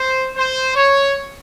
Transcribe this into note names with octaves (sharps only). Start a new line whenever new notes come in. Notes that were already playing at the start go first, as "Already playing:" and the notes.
Already playing: C5
C5
C#5